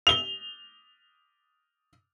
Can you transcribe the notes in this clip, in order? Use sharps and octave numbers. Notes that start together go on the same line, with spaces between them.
F7 G7